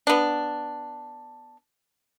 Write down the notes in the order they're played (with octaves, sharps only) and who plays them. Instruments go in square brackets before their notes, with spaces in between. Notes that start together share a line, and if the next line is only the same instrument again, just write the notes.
[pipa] B3 D4